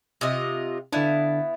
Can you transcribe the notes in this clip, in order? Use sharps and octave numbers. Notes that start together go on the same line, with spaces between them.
C3 F4 D#5
D3 B3 D4 E4 F5